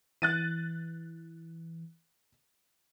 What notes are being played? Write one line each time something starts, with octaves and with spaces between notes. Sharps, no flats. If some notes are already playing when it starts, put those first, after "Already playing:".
E3 F#6 A6 D#7